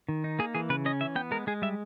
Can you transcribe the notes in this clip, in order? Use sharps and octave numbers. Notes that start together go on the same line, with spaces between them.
D#3
D#4
A#3 G#4
E3 G#4
C#3 B4
C#4 D#5
E3 E5
B3 G5
G#3 A#4
G#3 G#4
G3 E5